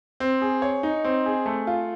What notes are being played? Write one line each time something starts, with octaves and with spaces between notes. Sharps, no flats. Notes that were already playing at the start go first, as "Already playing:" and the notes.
C4
G#4
C#5
D#4
C4
G#4
A3
F4